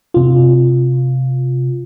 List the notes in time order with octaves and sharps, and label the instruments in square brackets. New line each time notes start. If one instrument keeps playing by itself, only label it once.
[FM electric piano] C3 F4